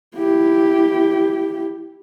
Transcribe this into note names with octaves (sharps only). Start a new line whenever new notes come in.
E4 G4